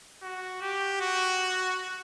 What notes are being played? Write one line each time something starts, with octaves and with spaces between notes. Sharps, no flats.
F#4
G4
F#4